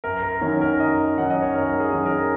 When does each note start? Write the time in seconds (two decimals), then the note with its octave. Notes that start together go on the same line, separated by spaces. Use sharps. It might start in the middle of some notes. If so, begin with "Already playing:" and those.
0.04 F#2 A#4
0.23 A#4
0.41 D#3 F#3 C#4 A#4
0.61 A#4
0.80 F#2 D#5
1.17 D#3 F#3 C#4 F#5
1.30 D#5
1.42 C#5
1.55 F#2 A#4
1.80 G#4
1.92 D#3 F#3 C#4
2.06 A#4